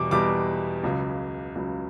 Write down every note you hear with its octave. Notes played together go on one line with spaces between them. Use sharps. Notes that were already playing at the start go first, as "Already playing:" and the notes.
Already playing: E2 B2 G3 D6
E2 B2 G3 D6
C#2 C#3 F#3
C#2 C#3 F#3